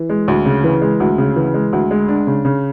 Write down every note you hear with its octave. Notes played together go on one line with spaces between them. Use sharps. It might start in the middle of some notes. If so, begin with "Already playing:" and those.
Already playing: E3
G#3
D2
C#3
E3
G#3
D2
C#3
E3
G#3
D2
G#3
D4
C#3
C#3